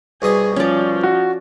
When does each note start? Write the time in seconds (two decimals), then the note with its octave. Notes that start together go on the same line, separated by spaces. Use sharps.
0.22 C2 B2 G#4 D#6
0.56 F3 C#4 D5
1.03 F#4